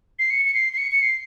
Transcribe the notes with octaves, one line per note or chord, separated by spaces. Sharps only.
C7
C#7
C#7
C7
C7
C#7
C#7
C7